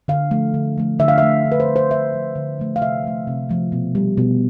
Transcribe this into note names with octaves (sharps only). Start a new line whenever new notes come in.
D3 F5
F3 A3
D3
F3 A3
D3 E5
F5
A3 E5
D3
B4
C5
A3
C5
D3 E5
F3 A3
D3
F3 A3
F5
C3 E5
F3 A3
C3
F3 A3
B2
G3
B2